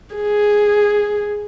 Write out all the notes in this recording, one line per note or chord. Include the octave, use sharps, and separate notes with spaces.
G#4